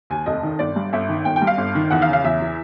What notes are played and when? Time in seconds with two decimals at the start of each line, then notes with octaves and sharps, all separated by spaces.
0.10 D#2 G#5
0.26 F1 D#5
0.43 D#3
0.59 G1 D5
0.76 G2
0.93 G1 E5
1.08 D#3
1.25 G1 G5
1.36 G5
1.42 G2
1.47 F5
1.58 G1
1.75 D#3
1.91 E2 F#5
2.02 F5
2.07 C#3
2.13 F5
2.24 E2 E5
2.40 E3